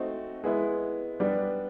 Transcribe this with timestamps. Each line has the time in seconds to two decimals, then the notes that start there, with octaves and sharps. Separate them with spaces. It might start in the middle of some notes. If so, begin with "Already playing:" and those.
Already playing: A3 C4 D#4 F#4
0.44 G#3 B3 E4
1.20 G3 B3 D4